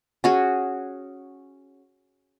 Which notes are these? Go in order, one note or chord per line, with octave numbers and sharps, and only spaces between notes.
C#4 F#4 G#4